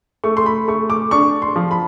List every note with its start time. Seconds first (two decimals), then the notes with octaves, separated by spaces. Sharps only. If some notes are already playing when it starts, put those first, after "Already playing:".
0.24 A3 C#6
0.37 C6
0.46 B5
0.68 A3 C#6
0.90 D6
1.11 D4 C#6
1.42 C6
1.56 F3
1.71 B5